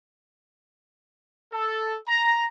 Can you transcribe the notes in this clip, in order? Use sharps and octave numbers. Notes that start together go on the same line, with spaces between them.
A4
A#5